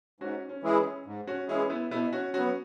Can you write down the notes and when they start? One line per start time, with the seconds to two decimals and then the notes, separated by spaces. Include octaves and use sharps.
0.20 G#2 C#4 F#4
0.49 C#4
0.63 E3 G#3 E4 G#4
0.78 C#4
1.06 G#2
1.27 C#4 F#4
1.48 E3 G#3 C#4 E4 G#4
1.70 B3 E4
1.91 B2 B3 E4
2.13 C#4 F#4
2.34 F#3 B3 C#4 F#4